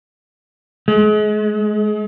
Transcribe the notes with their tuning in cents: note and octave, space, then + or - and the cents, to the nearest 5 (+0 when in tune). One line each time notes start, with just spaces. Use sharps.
G#3 +30